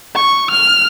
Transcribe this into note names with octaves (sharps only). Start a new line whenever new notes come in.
C#6
F6